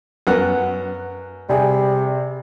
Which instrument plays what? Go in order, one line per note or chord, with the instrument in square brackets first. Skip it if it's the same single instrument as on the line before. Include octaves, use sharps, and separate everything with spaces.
[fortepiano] F#2 B3 F#5
[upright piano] C3 G#4 [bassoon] G3